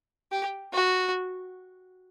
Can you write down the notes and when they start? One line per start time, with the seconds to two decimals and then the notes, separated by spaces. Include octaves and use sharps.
0.32 G4
0.73 F#4